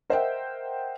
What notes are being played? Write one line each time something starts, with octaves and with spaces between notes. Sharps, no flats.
A#4 C5 D#5 E5 F#5 G5